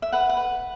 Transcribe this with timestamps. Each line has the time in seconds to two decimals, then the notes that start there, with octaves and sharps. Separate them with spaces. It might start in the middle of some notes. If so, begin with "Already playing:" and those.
0.02 E5
0.12 B4 F#5
0.29 F#5
0.37 B4